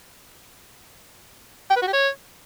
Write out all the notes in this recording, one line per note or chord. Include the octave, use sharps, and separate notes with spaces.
G5
B4
F#4
G4
C#5